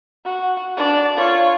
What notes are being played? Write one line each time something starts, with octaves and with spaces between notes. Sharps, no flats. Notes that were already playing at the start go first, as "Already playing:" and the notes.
F#4
D4 D5
F4 C#5